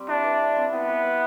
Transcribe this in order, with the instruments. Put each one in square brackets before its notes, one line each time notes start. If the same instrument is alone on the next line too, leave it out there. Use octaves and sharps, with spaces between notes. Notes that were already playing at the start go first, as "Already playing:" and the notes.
Already playing: [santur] G3 C4 G4
[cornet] D4 [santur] E4
[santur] B4
E5
C4
[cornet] B3 [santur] E4
[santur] B4
E5